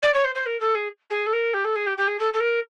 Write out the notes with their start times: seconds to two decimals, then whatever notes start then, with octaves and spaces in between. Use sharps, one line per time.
0.02 D5
0.14 C#5
0.24 C5
0.35 C5
0.46 A#4
0.60 A4
0.74 G#4
1.10 G#4
1.26 A4
1.33 A#4
1.53 G4
1.64 A4
1.75 G#4
1.86 G4
1.97 G4
2.07 G#4
2.19 A4
2.33 A4
2.40 A#4